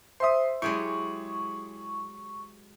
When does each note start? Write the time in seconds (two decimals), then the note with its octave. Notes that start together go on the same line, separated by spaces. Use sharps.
0.20 C5 E5 C6 D#6
0.62 F#3 G#3 E4 G4 G#4 C#6